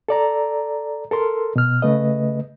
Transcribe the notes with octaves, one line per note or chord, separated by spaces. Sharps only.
A4 D5 A#5
A4 A#4 C6
B2 F6
C#3 A3 B4 D#5